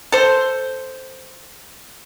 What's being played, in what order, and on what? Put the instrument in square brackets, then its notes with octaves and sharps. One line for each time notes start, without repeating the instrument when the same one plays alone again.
[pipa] A4 C5